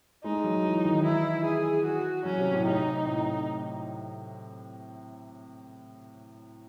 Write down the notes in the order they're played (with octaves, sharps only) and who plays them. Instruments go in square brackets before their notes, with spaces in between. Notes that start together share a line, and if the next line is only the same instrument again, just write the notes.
[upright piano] G#3 [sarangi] D#4
[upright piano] F#3
E3
D#3
[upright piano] E3 [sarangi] E4
[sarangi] G#4
F#4
[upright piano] F#3 [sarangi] C#4
[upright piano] C3
A2
[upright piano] C3 [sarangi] D#4
[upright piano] A2